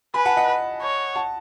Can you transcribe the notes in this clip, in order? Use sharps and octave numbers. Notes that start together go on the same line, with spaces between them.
B4 G#5 B5
F#5 A5
D#5 F#5
C#5
F#5 A5